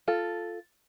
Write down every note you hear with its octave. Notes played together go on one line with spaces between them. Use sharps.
F4 A4